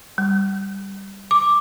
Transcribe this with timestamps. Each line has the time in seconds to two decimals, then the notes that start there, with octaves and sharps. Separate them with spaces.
0.18 G3
1.31 D6